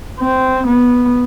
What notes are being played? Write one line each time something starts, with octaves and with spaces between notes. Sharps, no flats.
C4
B3